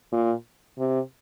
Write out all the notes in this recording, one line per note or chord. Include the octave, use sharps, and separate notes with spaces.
A#2
C3